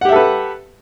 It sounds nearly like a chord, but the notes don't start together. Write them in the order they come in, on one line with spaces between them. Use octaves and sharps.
F#5 G4 E5 A4 B4